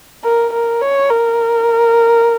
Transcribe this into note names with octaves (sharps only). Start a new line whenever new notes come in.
A#4
A#4
C#5
A#4